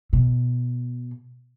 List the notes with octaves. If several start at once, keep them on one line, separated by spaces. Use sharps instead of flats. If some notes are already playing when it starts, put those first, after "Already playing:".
B2